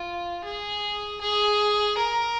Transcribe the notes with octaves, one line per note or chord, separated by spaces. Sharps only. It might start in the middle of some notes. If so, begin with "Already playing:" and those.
Already playing: F4
G#4
G#4
A#4